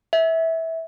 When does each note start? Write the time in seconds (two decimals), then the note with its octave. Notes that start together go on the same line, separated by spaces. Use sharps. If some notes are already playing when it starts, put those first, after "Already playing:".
0.13 E5